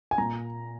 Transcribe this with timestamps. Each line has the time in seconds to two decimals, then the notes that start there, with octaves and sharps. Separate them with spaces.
0.11 G#5
0.18 A#2 A#5